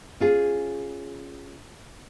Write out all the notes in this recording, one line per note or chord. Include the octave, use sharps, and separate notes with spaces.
C#4 F4 G#4